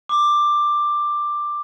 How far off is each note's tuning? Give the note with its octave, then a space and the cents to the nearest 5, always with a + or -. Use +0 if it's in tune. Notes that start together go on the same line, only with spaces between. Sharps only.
D6 +10